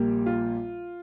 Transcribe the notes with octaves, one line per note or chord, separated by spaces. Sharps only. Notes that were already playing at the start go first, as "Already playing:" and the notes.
Already playing: A#1 A#2 G3 A#3 G4
F4